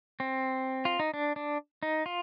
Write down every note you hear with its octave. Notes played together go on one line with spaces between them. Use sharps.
C4
F4
D#4
D4
D4
D#4
F4